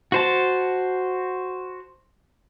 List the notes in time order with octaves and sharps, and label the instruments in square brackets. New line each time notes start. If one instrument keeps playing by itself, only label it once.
[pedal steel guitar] F#4 C5 A5